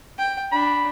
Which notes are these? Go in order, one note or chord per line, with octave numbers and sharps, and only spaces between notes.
G5
D4 B5